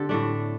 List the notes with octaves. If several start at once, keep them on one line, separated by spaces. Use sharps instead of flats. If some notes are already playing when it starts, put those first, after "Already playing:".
Already playing: D3 C4 G4 A4
A2 A3 D4